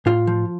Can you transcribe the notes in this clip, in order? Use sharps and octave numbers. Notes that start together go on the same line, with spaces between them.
A2 F4
F3